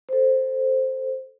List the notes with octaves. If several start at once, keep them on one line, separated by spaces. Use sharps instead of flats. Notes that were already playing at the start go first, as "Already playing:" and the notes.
A4 C5